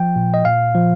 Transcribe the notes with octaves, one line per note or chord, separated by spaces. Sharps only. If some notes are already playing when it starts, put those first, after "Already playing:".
Already playing: F3 G5
A#2
D#5
A#2 F5
F3